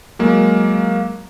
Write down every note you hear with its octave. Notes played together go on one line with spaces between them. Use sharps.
F#3 G#3 A#3